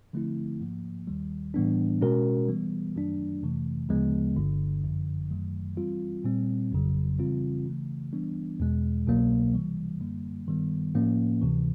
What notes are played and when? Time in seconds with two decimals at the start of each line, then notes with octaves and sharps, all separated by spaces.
0.13 D3 F3 A3 C4 E4
0.61 G#2 F3 A#3
1.07 D#2 D#3 G3
1.54 A2 E3 G3 B3 D4
2.01 B2 G#3 C#4 F#4 A#4
2.48 E3 G3 B3
2.96 F#2 D#3 F#3 A3 D4
3.42 F2 C3 E3 A3
3.89 D2 C#3 F3 G#3 B3
4.36 G1 G2 D3
4.84 G#1 F#2 D3 F3
5.31 F#2 D#3 F#3 A3
5.77 E3 G3 C4 F4
6.24 A#2 G3 C4
6.72 G1 F2 C#3 F#3
7.19 C#3 E3 G3 C4 F4
7.66 C#3 E3 A3
8.13 E3 G3 B3 D4
8.60 E2 B2 G#3
9.06 C2 B2 F#3 A#3
9.54 C3 E3 G3
10.01 F#2 D3 G3 A#3
10.47 G2 D#3 G3 B3
10.95 A2 F3 A#3 C#4
11.42 D2 C3 E3